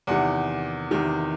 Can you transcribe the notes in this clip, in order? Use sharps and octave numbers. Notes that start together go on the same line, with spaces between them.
E2 C3 D#3 F#5
E2 C3 D#3